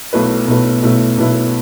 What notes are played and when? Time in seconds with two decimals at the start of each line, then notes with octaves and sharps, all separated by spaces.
0.13 B1 B2 A3 E4 B4
0.47 B1 B2 A3 E4 B4
0.83 B1 B2 A3 E4 B4
1.18 B1 B2 A3 E4 B4